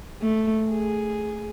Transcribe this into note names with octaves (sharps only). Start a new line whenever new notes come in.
A3
G#4